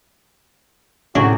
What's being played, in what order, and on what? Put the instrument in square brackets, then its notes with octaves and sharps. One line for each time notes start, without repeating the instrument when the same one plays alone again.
[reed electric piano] A2 [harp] C3 C#4 G#4 [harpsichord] D4 [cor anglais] F#4